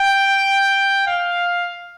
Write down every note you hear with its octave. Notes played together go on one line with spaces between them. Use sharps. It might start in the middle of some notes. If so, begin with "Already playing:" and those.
Already playing: G5
F5